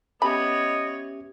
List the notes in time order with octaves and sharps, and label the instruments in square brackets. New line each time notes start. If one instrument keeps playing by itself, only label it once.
[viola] B3 C#5 [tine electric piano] C#4 G4 E5 [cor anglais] D#5 [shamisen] B5